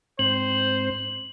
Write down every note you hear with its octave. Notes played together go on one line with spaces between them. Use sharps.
G#2 C4 C5 F#7